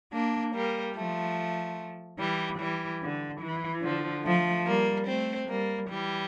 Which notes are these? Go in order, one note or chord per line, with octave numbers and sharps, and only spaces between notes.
A#3 D4
G3 A#3
F3 A3
E3 G3
E3 G3
D3
E3
D3 F3
F3 A3
G3 A#3
A3 C4
G3 A#3
E3 G3